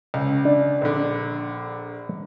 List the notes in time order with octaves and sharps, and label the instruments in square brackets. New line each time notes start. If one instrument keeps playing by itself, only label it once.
[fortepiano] C#2
[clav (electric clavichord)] D4
[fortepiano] A#1 D3